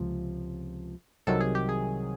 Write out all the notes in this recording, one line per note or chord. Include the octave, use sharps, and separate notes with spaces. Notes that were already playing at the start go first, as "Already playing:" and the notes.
Already playing: C#2 C3 F3
C2 C3 D#3 F#3 A4
G#4
G4
G#4